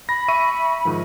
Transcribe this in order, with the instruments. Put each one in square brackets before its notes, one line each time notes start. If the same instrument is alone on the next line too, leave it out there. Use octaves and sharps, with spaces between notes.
[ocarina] B5 [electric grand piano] A#6
[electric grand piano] E5 C#6 D#7
G#2 D#3 F3